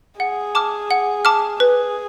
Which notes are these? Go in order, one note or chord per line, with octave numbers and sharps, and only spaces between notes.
G#4 F#5
A5 D6 F6
F#5
A5 D6 F6
G#4 B4